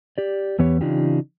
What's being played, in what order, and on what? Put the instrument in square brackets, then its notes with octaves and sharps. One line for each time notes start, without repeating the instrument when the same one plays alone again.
[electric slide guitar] G4 D5
E2 E3 B3 G4 C#5
C#3 E3 D4 D#4 F4 G4